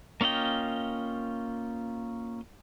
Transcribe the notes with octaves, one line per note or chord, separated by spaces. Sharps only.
A#3 C#4 F4 D#5 G5